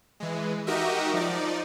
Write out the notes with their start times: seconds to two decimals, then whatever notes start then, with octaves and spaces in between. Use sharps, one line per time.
0.20 E3 G#3
0.67 D#4 F#4 G4 A#4 D#5 E5
1.13 F3 D#4 D5